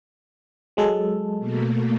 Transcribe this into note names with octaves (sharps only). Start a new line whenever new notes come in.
F#3 G#3 A4
B2 A3 A#3